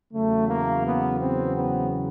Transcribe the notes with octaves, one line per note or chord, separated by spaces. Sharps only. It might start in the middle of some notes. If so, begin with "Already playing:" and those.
E2 C#3 F#3 A3
A#3
B3
C4
B3